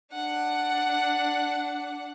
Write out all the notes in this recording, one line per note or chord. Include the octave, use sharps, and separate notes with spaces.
D4 F#5